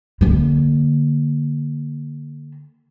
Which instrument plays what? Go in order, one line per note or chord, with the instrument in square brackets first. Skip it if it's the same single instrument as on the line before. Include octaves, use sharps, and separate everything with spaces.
[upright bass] D3 A#3